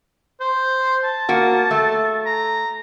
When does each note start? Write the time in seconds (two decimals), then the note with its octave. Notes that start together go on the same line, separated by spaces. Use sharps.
0.40 C5
1.04 A5
1.29 A#3 F#4
1.71 A3
2.26 A#5